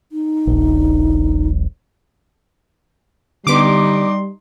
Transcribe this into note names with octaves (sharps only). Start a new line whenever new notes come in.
D#4
D#1 A#1
D3 G3 B3 D#4 C6 D6